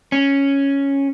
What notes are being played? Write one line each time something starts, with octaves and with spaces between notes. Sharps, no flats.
C#4